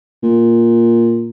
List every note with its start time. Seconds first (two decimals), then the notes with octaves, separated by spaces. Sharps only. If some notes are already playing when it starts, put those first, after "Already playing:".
0.23 A#2